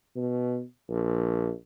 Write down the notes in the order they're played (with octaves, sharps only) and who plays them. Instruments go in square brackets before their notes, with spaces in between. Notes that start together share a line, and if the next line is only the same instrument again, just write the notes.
[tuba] B2
A#1